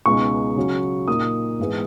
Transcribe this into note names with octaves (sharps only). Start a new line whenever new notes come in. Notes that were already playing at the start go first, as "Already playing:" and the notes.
C#2 B2 G#3 D#4 C#6
C#3 F#3 C#4
A#2 A#3 D#4 D#6
G#2 E3 G#3 B3